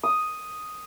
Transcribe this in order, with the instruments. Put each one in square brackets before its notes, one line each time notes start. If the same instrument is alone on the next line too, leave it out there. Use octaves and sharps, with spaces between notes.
[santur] D#6